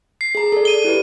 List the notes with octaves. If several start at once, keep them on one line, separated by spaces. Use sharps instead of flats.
C7
G#4 A#5
A4 D5
D#7 G7
E4 G4 B4